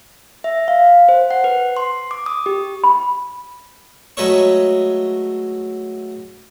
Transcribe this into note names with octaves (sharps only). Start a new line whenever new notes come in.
E5
F5
C5
F#5
B4
C6
D6
D#6
G4
B5
F#3 G#3 A3 B4 C#5 C#6